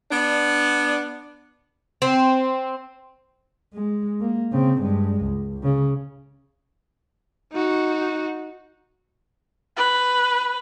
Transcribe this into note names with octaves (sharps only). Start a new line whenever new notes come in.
B3 D4
C4
G#3
A#3
C#3 C4
G2 G#3
C#2
C#3
D#4 F#4
B4